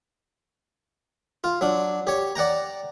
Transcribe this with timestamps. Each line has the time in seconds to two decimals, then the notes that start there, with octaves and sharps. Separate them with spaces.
1.44 F4
1.61 F#3 D4
2.07 G4 C#5
2.36 D5 F#5 G5 A#5